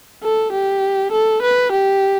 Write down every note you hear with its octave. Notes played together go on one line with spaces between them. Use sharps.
A4
G4
A4
B4
G4